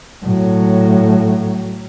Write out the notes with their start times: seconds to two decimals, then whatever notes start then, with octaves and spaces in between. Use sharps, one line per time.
0.25 A2 F#3